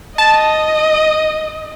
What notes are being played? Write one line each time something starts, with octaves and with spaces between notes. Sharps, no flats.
D#5 A5